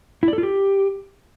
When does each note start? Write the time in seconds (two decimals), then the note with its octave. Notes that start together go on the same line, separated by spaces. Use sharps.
0.23 E4
0.28 D5
0.33 A4
0.38 F4
0.43 G4